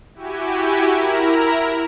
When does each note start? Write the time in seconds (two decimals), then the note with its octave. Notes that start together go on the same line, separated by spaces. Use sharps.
0.14 E4 F#4 G4 G#5
0.91 E4 A#4 A#5